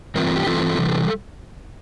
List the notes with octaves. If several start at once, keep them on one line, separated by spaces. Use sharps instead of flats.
G2 E3 A3 C4 F4 A#4
A#4
G4
G2 E3 A3 C4 F4 A4
C3 E3 G3